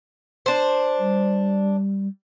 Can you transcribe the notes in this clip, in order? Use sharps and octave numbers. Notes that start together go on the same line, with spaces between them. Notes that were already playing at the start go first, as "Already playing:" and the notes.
D4 C5
G3